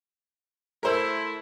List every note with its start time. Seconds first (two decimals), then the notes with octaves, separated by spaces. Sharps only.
0.83 A3 E4 A#4 C5 E6